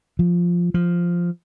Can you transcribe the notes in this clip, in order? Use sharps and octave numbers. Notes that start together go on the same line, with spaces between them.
F3
F3